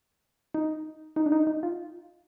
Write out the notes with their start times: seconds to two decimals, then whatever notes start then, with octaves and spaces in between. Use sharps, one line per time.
0.54 D#4
1.16 D#4
1.26 D4
1.32 D#4
1.47 D#4
1.63 F4